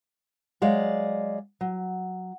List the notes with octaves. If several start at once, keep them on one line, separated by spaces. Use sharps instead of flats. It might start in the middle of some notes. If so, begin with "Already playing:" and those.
F#3 G#3 D5 D#5 F5
F#3